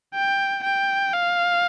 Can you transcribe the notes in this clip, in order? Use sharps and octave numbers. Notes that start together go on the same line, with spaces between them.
G5
G5
F5